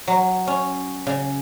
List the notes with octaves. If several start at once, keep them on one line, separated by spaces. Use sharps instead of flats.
F#3
C#4
C#3